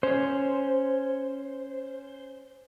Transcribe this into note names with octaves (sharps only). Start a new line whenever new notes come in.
C#4 C5